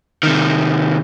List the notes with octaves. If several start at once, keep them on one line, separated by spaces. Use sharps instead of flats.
C3 D#3